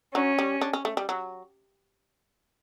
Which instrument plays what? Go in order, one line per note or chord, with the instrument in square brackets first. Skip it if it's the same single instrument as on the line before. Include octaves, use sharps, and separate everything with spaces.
[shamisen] F#3 [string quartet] C#4
[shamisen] G3
D4
C#4
A3
G3
F#3